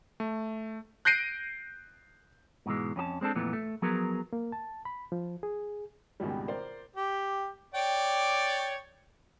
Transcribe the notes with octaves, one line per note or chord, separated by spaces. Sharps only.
A3
F#6 G6 A#6 C7 D7 D#7
G#2 B2 E3 G#3
F2 C#4 G4 A5
G#3 C4 D4 A4
F2 A#2 E3 A3 B3
A3
F3 F#3 B3 G#4 A#4
A#3
A5
B5
F3
G#4
G#1 C#2 B2 D#3 G3
A#4 C5 D5
G4
C#5 D5 G5